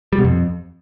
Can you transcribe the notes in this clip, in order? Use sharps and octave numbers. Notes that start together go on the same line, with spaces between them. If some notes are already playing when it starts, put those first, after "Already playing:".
G3
B2
F2